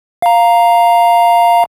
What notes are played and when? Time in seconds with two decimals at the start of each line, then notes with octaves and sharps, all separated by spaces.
0.22 F5 A#5